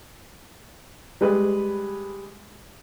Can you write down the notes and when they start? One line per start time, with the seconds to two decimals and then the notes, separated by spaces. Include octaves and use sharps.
1.21 G3 G#3 B4